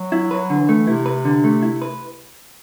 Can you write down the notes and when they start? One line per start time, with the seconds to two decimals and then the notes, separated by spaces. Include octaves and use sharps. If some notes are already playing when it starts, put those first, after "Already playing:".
Already playing: F#3
0.12 E4
0.31 F#3 B4
0.50 D3
0.59 E3
0.69 A3
0.87 C3 E4
1.06 B4
1.25 D3
1.44 A3
1.62 E4
1.82 B4